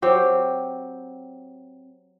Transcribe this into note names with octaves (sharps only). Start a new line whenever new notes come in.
F#3 C4 G4